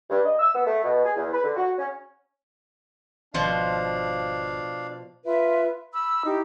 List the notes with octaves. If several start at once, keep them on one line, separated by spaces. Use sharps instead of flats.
G2
D#5
E6
B3
A3
B2
G#4
E2
B4
D3
F#4
C#4
G#1 B2 F3 D4 D5 F5 C6
F4 B4 E5
B5 E6
D#4 E4 G4